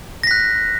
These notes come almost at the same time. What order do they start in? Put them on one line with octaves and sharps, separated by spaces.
A#6 B6 F#6